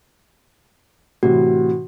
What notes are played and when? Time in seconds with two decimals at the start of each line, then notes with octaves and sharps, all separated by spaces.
1.23 A2 C3 E3 F#4